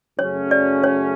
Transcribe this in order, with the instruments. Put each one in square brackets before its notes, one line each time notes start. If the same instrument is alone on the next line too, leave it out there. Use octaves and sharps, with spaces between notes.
[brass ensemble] F#2 C#3 F#3 A3 C#4 [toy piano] C#5
[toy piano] D5
C#5